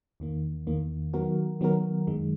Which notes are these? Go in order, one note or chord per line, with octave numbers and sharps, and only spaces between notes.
E2 D#3 A#3
E2 D#3 A#3
D#3 F#3 B3 F#4 A#4
D#3 F#3 B3 F#4 A#4
F#2 D#3 G#3